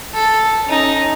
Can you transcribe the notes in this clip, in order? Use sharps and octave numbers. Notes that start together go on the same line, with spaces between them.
A4
C#4 D#4